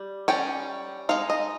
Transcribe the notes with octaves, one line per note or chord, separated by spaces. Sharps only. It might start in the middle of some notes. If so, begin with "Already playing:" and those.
Already playing: G3
G3 C#4 G5
G#3 D#4 F5
D#5